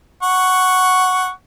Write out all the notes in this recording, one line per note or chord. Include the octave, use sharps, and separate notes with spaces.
F#5 C#6